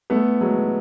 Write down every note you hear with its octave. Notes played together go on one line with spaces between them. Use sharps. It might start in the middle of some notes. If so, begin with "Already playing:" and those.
A3 B3
F#3 G#3